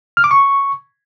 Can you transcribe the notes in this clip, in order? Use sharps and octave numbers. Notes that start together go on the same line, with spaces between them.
F6
D6
C#6